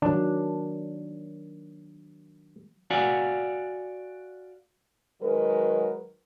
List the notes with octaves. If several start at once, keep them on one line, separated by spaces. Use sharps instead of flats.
D#3 F#3 D4
F#4 D5 F5 F#5 G#5
D#3 F#3 G#3 A#4 B4